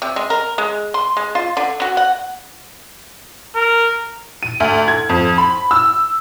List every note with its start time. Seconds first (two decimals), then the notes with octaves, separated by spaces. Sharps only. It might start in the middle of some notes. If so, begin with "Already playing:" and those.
0.02 C3
0.16 G#3
0.30 A#4
0.58 G#3
0.94 C6
1.17 G#3
1.35 F4
1.57 D3
1.82 F#4
1.97 F#5
3.55 A#4
4.43 D#7
4.60 D2
4.88 G#6
5.09 F2
5.38 B5
5.71 E6